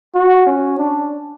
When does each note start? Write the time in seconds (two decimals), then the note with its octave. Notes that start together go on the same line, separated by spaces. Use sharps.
0.15 F#4
0.46 C#4
0.78 D4